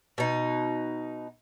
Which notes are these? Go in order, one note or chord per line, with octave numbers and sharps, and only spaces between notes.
B2 D#4